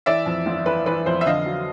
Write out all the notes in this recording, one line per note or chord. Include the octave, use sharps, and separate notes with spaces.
E3 D5 E5
F2
G1
E3 B4
E3 B4
F2 C5
E5
D3 D#5 F5
F#3